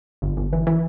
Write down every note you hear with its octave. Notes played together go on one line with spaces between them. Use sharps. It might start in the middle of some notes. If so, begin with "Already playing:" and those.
G1
G1
E3
E3